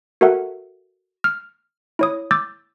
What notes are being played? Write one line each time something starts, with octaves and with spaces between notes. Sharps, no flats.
F#4 A4 A#4 E5 F#5
F6
E4 C#5 D#6
D6 E6 G6 A6